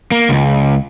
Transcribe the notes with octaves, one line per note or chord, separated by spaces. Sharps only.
A#3
C#2